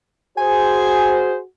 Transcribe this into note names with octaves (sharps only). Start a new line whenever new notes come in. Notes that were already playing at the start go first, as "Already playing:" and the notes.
F#4 G#4 C5 G#5